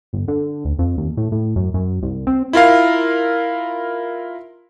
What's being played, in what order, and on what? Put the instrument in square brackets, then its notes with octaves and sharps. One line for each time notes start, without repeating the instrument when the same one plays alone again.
[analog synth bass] G1
D3
D2
F2
D#2
A2
A2
F#2
F#2
C2
C4
[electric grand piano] E4 F4 A#4 F5